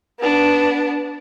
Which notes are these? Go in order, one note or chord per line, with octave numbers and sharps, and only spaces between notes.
B3 D4